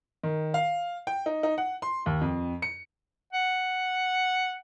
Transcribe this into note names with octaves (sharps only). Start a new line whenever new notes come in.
D#3
F5
G5
D#4
D#4
F#5
C6
D#2
F2
C#7
F#5